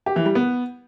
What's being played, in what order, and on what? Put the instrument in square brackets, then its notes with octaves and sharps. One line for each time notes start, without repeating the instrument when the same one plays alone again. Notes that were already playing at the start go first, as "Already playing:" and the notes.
[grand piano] G4
E3
G3
B3